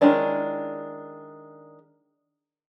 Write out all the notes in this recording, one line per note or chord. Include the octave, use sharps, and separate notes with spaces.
D#3 G#3 C#4 D4 E4